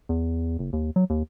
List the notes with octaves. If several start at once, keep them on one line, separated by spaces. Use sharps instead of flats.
E2
F#1
D#2
F#3
D#2